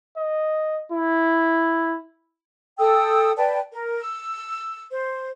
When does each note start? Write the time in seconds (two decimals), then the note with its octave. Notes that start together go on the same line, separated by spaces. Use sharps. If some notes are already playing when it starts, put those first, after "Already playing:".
0.16 D#5
0.92 E4
2.79 A4 G5 D#6 E6
3.37 B4 D5 G5 A5
3.72 A#4
4.01 E6
4.90 C5